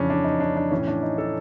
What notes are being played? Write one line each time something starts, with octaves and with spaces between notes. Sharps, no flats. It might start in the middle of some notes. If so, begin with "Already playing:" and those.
Already playing: F2 C#3 E3 C#4 D4
D4
D#4
D4
D4
A2 E3 C#4
D4
D#4
A4